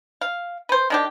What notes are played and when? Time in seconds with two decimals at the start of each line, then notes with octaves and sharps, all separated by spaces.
0.21 F5
0.69 B4 C5
0.90 D#3 D4 G4